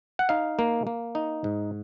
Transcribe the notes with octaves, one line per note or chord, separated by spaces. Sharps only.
F#5
D#4 F5
A#3
A#3
D#4
G#2